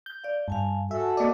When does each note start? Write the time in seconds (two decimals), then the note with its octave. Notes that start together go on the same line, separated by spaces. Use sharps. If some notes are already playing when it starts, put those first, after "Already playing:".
0.06 G6
0.24 D5 F5
0.48 G2 F5 G#5 A5
0.91 F#4 A4 E5 G#5
1.17 A#3 D5 D#5 D6